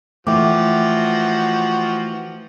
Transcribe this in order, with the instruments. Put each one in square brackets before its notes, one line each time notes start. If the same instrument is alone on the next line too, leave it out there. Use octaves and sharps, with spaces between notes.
[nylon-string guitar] E3 [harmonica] F3 F#4 [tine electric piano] A3 [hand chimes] E5 G5 D6